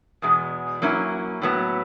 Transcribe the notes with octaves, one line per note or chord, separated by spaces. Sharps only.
E2 B2 G#3
F#3 A#3 C#4 E4
A2 F#3 B3